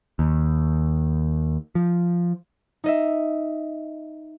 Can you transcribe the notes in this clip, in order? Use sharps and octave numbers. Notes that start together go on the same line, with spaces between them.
D#2
F3
D#4 D#5 E5